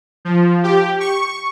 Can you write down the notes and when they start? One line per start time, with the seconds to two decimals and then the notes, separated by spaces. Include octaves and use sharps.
0.25 F3
0.63 G4
1.00 C#6